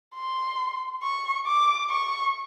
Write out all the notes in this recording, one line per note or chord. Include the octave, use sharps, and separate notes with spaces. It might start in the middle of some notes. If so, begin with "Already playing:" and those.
C6
C#6
D6
C#6